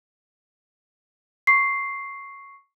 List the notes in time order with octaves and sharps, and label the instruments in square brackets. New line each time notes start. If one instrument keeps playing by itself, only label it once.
[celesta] C#6 C7